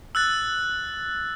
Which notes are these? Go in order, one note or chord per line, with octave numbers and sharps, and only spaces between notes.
E6 F#6 A6